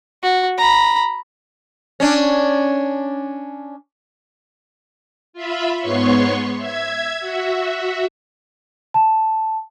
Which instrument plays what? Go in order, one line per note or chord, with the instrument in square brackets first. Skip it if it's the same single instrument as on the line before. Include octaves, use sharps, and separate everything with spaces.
[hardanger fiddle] F#4
A#5 B5
[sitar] C#4 D4
[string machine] F4 E5 B5
G#2 B3 C#5 C6 C#6
E5 G#6
F#4 E5
[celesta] A5